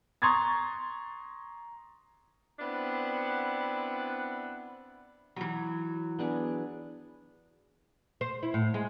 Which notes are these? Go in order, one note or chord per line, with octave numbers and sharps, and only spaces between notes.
A#5 C6 C#6 D#6 G#6 A6
B3 C4 D4 E4 F#5
E3 F#3
B3 D4 G#4
C5
E4
A2
G#3